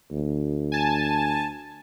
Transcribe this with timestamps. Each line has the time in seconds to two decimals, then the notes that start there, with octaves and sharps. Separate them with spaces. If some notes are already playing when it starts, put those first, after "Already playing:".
0.12 D2
0.72 G#5 A5